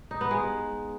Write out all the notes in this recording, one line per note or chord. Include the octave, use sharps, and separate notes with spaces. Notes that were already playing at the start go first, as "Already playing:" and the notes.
D#4
B3
G#3